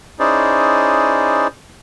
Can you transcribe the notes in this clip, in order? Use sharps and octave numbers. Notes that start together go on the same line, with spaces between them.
C#4 D#4 E4 G#4 C5 D5